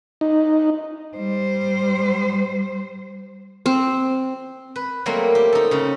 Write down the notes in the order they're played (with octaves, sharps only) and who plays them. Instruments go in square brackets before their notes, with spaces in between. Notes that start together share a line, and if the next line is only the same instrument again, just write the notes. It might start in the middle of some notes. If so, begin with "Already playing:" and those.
[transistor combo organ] D#4
[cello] G3 C5
[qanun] C4
[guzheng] B4
F#3 G3 A3 A#3 C4
G4
D#4 A4
C#3 D#4